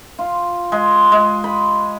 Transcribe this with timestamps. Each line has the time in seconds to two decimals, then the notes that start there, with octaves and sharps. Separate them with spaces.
0.19 F4
0.72 G#3
1.12 G#3
1.44 B5